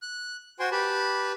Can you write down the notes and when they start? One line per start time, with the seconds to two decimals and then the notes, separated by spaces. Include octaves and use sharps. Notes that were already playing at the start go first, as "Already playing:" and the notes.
0.02 F#6
0.59 F#4 C5 G5 G#5 C6
0.72 G4 B4 A5 B5